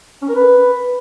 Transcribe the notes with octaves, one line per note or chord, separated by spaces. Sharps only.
C#4
A#4
B4